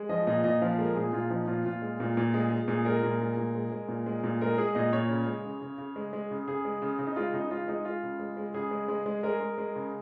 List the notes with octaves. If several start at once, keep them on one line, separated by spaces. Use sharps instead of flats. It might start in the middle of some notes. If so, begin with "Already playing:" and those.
Already playing: G#3
F3 D#5
A#2 D#5
A#2 D#5
F3 F5
G#3 A#4
A#2 G#4
A#2 F4
F3 D#4
A#2 F4
A#2 F4
G#3
A#2
A#2
G#3 G#4
G#3
A#2 G#4
G#3 A#4
A#2
G#3
A#2
G#3
G#3
A#2
G#3
A#2
G#3 A#4
G#3 G#4
A#2 D#5
A#2 C#5
C#3
G#3
C#3
C#3
C#3
G#3
G#3
C#3
C#3 G#4
G#3
C#3
C#3
D#4
G#3 F4
C#3 D#4
G#3 F4
G#3 D#4
G#3 F4
C#3
G#3
G#3
C#3 G#4
G#3
G#3
G#3
G#3 A#4
G#3
G#3
C#3